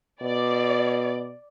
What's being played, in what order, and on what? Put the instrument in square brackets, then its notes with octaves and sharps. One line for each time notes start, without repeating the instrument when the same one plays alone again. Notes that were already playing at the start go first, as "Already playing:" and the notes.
[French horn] B2 [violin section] D5